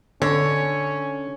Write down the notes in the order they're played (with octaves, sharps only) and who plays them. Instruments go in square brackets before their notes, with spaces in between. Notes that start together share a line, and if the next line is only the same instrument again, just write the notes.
[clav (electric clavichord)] D3 [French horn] C#4 [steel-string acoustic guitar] C#5